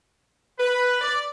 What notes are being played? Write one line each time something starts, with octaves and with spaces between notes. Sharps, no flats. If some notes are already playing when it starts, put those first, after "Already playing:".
B4
D5